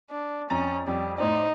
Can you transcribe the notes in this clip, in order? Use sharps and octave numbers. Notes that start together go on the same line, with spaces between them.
D4
F2 C#4 A#5 A6
F2 G3
A2 D#4 C5 D5